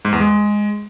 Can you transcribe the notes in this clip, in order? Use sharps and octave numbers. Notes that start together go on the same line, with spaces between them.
G#2
E2
G#3